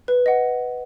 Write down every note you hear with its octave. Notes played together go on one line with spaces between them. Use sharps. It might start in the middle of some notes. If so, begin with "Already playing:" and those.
B4
D#5 F#5